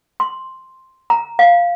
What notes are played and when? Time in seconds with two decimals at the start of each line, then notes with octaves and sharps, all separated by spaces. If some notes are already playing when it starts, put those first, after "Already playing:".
0.20 C6
1.10 A#5
1.39 F5